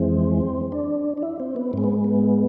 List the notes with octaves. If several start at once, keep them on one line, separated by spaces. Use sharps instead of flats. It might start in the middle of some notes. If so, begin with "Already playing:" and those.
Already playing: F2 E3 G#3 C4
D4
D4
E4
C4
B3
G#2 G#3 C4
B3
B3